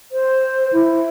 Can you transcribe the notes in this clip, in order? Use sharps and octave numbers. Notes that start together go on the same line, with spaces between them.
C5
E4